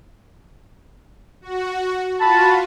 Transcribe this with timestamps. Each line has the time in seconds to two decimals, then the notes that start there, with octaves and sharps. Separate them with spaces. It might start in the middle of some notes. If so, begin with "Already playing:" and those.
1.42 F#4
2.21 F4 F#4 A5 B5